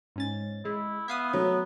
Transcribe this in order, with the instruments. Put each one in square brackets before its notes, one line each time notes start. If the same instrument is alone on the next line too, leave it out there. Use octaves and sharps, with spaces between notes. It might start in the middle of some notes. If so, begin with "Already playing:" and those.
[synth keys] G#2 C#4 A6
[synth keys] G#3 [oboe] E4
[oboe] B3 [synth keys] E5 F5 D#6
[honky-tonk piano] F#3 [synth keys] A3